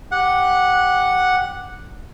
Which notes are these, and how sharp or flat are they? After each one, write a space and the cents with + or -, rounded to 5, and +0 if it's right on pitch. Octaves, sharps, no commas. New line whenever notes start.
G4 +0 F#5 -10